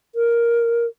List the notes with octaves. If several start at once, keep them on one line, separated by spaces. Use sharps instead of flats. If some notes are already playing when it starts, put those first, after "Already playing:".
A#4